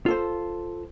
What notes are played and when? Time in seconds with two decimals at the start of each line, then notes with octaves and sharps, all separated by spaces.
0.06 F4 A4 C5